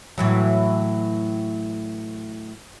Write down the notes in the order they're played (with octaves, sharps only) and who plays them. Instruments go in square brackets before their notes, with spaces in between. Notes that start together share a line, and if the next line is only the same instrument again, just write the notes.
[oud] A2 E3 F#3